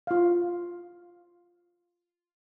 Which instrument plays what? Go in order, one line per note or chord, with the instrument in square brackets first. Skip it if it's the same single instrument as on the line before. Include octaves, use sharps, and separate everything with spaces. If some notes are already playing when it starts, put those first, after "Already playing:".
[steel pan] F4 F5